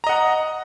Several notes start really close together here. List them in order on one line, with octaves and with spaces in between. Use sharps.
A#5 D#5 F#5